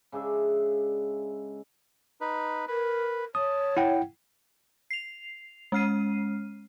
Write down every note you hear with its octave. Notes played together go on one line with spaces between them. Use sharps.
C#3 G#3 D4 E5
D#4 B4
A#4 B4
C#5 A5 D#6
E4 F#5 G5
C7 F7
G#3 C#4 F6 C7 D#7